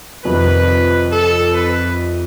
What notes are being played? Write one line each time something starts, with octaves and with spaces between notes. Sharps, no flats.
F2 C3 D#3 B4
A4
B4